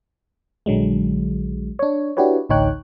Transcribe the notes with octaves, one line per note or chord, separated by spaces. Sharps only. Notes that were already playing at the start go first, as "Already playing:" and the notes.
A#1 D3 F#3 G#3
D4 C#5
D4 E4 F#4 G4 B4 C#5
A1 D2 D#4 C#5 G5 F#6